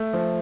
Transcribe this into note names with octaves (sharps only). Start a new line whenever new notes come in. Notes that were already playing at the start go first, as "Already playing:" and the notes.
Already playing: A3
F3